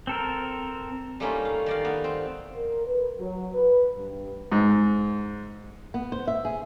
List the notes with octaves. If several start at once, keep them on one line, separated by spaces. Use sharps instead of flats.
C4 A4 A#4
G3 A3 A#3 C#4 D#4 F4
F5
D#3 D5 F5
B3
C4
A#4
B4
F#3
B4
G2
G#2
B3
C5
E5
G#4